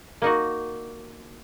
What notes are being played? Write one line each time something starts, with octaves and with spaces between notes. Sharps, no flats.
A#3 D#4 F#4